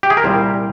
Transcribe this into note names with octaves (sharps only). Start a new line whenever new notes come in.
G4
G#4
A#4
C2 A#2 G3 C5